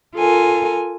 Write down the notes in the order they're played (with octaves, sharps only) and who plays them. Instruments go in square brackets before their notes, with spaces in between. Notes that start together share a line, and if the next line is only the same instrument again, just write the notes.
[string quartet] F4 A4 A#4 G#5